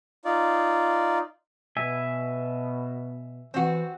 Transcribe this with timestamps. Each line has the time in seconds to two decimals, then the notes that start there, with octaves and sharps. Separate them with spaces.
0.25 D#4 F4 D5
1.77 B2 E5 G#5
3.54 E3 C4 F#4